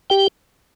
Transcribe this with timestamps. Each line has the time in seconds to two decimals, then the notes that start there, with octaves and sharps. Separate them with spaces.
0.10 G4 G5